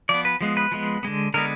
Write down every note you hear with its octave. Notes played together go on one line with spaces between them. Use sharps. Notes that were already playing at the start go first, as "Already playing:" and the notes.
F3 B3 D5
B4
F3 G#3 B3
B4
F3 G#3 B3
D3 G#3 B3
D3 G#3 B3 A#4